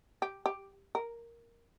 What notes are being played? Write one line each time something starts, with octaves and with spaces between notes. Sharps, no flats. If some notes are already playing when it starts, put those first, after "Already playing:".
G4
G4
A#4